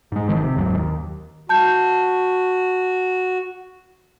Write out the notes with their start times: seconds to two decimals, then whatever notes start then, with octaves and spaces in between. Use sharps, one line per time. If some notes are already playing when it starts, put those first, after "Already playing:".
0.12 G#2 G#3
0.27 G#1 D#3 F3
0.42 C3
0.55 F#1 D#2 G#2 F#3
0.75 D#2
1.49 F#4 A5 G6